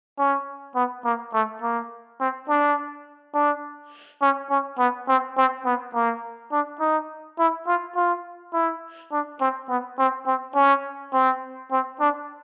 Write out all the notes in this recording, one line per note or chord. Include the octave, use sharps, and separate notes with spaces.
C#4
B3
A#3
A3
A#3
C4
D4
D4
C#4
C#4
B3
C4
C4
B3
A#3
D4
D#4
E4
F4
F4
E4
D4
C4
B3
C4
C4
C#4
C4
C4
D4